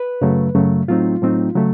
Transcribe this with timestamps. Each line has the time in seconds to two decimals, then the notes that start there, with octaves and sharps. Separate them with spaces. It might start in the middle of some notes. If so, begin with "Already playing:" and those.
Already playing: B4
0.21 F#2 C#3 F#3 A3
0.55 F#2 C#3 F#3 A3
0.88 A2 F#3 A3 C4 D#4 F4
1.21 A2 F#3 A3 C4 D#4
1.55 C#3 F#3 A3